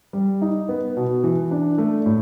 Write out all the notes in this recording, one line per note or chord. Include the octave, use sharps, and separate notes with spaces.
G3
D#4
B3
B2
E3
D4
A3
A2